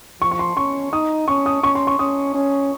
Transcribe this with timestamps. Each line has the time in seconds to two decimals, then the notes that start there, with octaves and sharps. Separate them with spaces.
0.21 F3 C#6
0.31 C#6
0.39 C6
0.57 C#4 C#6
0.92 D#4 D#6
1.28 C#4 C#6
1.46 D#6
1.63 C#4 C#6
1.75 C6
1.87 C#6
1.99 C#4 D#6
2.34 C#4